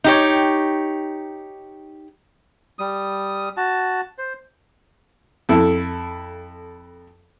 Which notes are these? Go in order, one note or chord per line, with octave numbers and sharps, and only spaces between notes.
D#4 G4 C#5
G3 D#6
F#4 A5
C5
F2 E4 A4